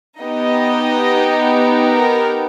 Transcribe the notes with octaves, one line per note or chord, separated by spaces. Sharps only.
B3 D#4 G4 D#5
A#4